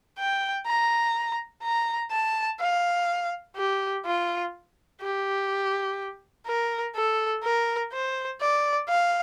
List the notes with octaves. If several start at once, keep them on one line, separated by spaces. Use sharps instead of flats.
G5
A#5
A#5
A5
F5
G4
F4
G4
A#4
A4
A#4
C5
D5
F5